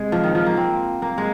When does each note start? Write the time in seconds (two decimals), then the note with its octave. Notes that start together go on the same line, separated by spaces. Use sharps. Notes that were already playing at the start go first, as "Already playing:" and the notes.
Already playing: C3 G#3
0.12 F3
0.24 D#3
0.35 F3
0.46 A#3
0.57 C4
1.02 A#3
1.18 G#3